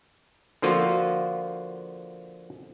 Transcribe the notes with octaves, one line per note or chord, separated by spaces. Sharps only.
D3 F3 A#3 F4 F#4